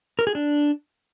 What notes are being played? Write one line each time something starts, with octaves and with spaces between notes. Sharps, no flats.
A#4
G#4
D4